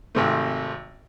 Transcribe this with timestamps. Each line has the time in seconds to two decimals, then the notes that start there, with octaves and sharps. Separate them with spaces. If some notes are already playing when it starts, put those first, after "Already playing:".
0.15 G#1 C3 A3